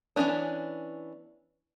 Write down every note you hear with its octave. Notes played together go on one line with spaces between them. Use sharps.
E3 G#3 B3 C#4 D4